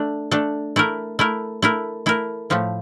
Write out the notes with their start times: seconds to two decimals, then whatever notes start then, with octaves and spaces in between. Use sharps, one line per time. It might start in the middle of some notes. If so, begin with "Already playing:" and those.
Already playing: A3 D4
0.31 A3 D4 A4
0.76 A3 E4 A#4
1.19 A3 E4 A#4
1.62 A3 E4 A#4
2.06 A3 E4 A#4
2.50 A2 F3 A3